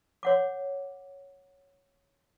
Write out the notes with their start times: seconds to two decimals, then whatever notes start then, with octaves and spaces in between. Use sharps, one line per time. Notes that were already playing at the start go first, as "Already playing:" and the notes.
0.23 C#5 F#5 D6